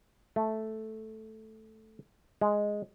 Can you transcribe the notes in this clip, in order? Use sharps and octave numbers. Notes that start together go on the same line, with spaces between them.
A3
G#3